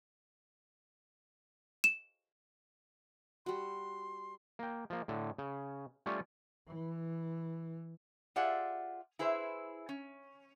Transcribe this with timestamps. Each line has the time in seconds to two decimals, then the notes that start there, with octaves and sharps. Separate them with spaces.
1.84 E7
3.46 G3 F#4 C6
4.59 A#3 G5
4.90 F3 A#3
5.08 A2 D3
5.38 C#3
6.06 G3 A3 C#4 F4 C#5 D5
6.68 E3
8.36 F4 G4 G#4 D5 E5 F#5
9.19 E4 G#4 B4 C5 E5
9.89 C#4